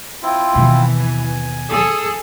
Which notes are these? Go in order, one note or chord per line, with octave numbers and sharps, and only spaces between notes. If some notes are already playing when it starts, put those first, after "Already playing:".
C4 E4 F4
D#2 B2 E3
G#5
G#4 A4